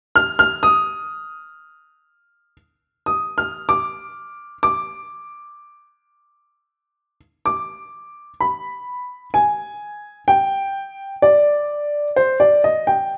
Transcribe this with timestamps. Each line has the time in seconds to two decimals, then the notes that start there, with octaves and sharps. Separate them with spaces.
0.16 F6
0.39 F6
0.63 D#6
3.06 D#6
3.38 F6
3.69 D6
4.63 D6
7.46 D6
8.40 B5
9.34 G#5
10.28 G5
11.22 D5
12.16 C5
12.40 D5
12.64 D#5
12.87 G5